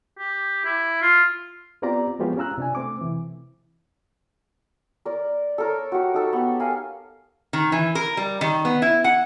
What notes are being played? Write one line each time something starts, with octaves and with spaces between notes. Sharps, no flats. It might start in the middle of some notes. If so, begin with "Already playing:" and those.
G4
E4
F4
B3 C4 F4 G4 D5 A#5
F3 G#3 B3 F4 G4 C#5
C#4 F4 A#5 E6 F#6
C3 D4 G#5
A3 C4 D6
C3 E3
A#4 D5
A4 A#4 C#5
F#4 G4
D#4 A4
B3 G4
A#4 F5 F#5 G#5
D#3
E3
A#4
G3
D#3
B3
E4
F#5